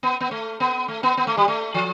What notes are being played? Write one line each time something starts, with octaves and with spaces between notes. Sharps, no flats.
B3
B3
A3
B3
A3
B3
B3
A3
G3
A3
F3